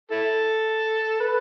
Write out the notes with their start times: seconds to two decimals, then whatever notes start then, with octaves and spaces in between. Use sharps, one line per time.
0.11 E4 A4
1.20 B4